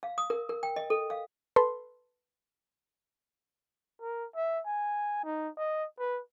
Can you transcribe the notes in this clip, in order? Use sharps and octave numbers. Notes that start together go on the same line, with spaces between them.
F5
D#6
A#4
A#4
G5
D#5
A4
F5
A4 B4 C6
A#4
E5
G#5
D#4
D#5
B4